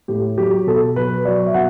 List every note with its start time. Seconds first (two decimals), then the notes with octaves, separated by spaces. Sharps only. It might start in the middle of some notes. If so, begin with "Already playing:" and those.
0.08 A2 G4
0.38 F#3 G4
0.67 B2 A4
0.96 F#3 B4
1.25 F#3 D5
1.46 E5
1.54 B2 F#5